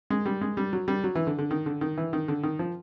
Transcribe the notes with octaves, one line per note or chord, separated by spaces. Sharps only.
G#3
G3
G#3
G3
F#3
G3
F#3
E3
D3
D3
D#3
D3
D#3
E3
D#3
D3
D#3
F3